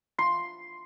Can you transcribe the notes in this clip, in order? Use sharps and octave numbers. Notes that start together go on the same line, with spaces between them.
C6